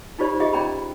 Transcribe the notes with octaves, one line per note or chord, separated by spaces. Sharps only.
D#4 F4 G4 C5 D5 B5
F4 G4 G#4 D#5 E5
C#4 D5 G5 A#5 B5